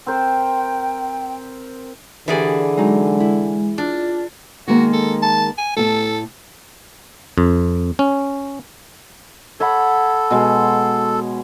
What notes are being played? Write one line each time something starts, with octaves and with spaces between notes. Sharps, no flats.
C4 A#4 C5 G5
D3 E3 G4 G#4 A#4 B4 D5
F#3 G#3 D#4
E4
D4 F4
D#3 G#3 A#3 F#4
A4
A5
G#5
A2 A3 A4
F2
C#4
A4 C#5 F#5 B5
B2 G#3